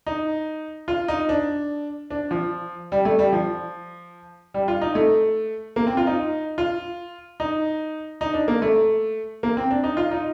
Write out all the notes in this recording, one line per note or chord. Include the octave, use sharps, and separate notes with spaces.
D#4
F4
D#4
D4
D4
F3
G3
A3
G3
F3
G3
F4
D#4
A3
A#3
C4
F4
D#4
F4
D#4
D#4
D4
A#3
A3
A#3
C4
D4
D#4
F4
D#4